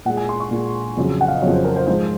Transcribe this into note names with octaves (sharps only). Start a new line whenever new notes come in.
A#2 G#3 F#5
G#5
C6
C#6
A#2 G#3
F2 C#3 F#3
F#5
F5
D#5
F2 C#3 F#3 C#5
C5
A#4
C5
G#2 F3 G#3 C5